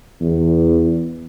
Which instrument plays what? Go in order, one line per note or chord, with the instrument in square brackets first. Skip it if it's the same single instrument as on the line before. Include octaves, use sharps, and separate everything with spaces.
[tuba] E2